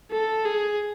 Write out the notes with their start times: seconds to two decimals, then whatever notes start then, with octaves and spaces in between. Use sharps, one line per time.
0.11 A4
0.45 G#4